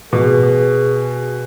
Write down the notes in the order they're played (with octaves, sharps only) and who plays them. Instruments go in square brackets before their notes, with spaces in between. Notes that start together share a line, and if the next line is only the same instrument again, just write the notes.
[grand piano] B2 [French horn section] G#4